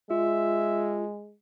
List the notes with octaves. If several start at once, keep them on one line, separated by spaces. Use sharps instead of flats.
G#3 F4 E5